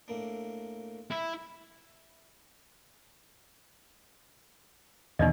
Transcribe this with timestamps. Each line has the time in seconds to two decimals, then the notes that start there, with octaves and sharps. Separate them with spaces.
0.08 A2 A#3 D4
1.11 E4
5.19 E2 B2 D#3 D#4 D5 D#5